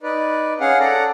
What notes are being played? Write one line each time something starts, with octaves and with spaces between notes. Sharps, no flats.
D#4 B4 D5
C#4 G#4 F5 F#5
A4 D5 F#5 A#5